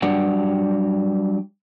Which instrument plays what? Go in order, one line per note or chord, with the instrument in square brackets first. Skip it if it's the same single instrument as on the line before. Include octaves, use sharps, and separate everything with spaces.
[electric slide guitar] F#3 G3 D4 G4 D5 F#5